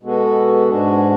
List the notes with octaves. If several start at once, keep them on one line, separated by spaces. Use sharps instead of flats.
B2 G#3 B3 F#4 A4
G#2 G#3 D4 F#4